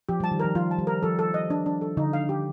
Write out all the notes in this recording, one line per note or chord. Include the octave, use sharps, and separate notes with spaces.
F3 G4
G3
A5
D#3
F3 A#4
F3 F4
A5
G3
A#4
F3 A4
A4
D#5
D4
D4
A4
D3 D#4
F5
G4